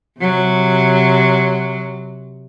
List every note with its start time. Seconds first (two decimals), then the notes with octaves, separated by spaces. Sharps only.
0.20 C3 F#3